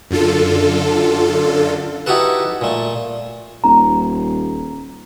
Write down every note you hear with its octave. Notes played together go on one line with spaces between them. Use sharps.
F#2 D3 F4 A4
D#4 E4 F#4 G4 A4 B4
A#2 A3
D#1 A#5